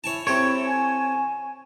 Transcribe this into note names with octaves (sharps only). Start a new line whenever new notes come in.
E4 C#5 G#5 A5
C4 E4 G4 A4 C#5
G#5